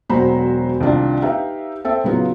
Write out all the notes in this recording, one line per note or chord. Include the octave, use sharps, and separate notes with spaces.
E1 F#3 F#4 C5 A#5 B5
C2 D#3 D4 F4
D#4 G4 B4 E5 F5
C4 A4 E5
C#3 F#3 B3 D#4 F4